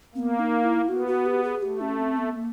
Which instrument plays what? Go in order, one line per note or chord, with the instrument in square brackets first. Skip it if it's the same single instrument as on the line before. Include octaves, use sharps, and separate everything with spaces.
[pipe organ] A#3 [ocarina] C4
[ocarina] B3
D#4
E4
[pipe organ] B3 [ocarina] F#4
[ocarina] F#4
G4
G#4
[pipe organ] A3 [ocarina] G4
[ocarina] C#4
C4
B3
A#3